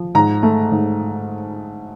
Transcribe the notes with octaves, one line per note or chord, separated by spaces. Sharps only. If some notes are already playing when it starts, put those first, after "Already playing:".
Already playing: F3
G#2 A#5
A3
G#2